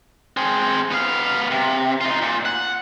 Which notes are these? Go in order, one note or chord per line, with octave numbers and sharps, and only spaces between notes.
C4 G#4
B3 F5
C3
D#4 F4
A#2
F#5